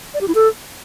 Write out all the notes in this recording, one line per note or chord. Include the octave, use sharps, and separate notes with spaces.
D5
G4
E4
A4